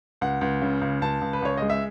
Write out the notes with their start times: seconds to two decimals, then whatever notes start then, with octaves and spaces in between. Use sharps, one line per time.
0.21 C#2 F#5
0.41 C#2
0.62 C#3
0.81 C#2
1.02 C#2 A5
1.21 C#2
1.33 B4
1.42 C#2 C#5
1.57 G#3 D#5
1.70 E5